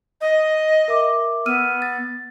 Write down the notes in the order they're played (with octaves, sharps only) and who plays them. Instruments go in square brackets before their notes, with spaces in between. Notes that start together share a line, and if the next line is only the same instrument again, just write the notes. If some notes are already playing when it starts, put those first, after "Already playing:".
[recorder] D#5
[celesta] A#4 E5 D6
[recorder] B3 [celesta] E6 F6 D#7
[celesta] A6